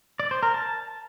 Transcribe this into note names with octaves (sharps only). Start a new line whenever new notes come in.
D5
C5
A#4
A5